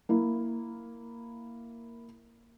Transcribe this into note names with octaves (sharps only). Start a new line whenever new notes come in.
A#3 E4